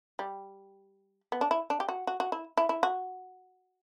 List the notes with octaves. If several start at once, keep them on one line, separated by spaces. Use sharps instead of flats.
G3
B3
D4
E4
D4
G4
F#4
F#4
F#4
E4
E4
E4
F#4